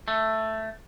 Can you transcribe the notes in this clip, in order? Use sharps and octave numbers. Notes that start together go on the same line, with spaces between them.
A3